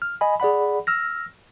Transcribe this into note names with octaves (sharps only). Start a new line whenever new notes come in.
F6
D#5 G#5 B5
G#4 D5 F#5 B5
E6 F6 A#6